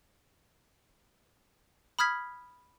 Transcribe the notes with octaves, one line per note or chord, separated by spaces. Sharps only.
B5 D#6 F6 G#6 B6